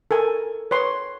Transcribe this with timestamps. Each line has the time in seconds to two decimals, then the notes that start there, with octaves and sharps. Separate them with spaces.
0.11 A4 A#4 G#5
0.71 B4 C#5 C6